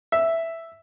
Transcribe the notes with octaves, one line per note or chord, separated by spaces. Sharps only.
E5